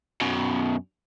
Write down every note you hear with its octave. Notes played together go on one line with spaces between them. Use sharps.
F#2 B2